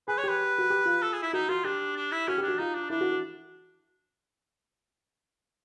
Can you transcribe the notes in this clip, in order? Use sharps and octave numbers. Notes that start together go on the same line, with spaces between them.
G#4 B4
C#5
G4 B4
F#4
G4
F4
A4
G#4
E4
D#4 F#4
F4 F#4
D4 G4
D4
E4
C#4 F#4
G4
D4
F#4
D#4 F4
D4
D4 E4
F#4
F#4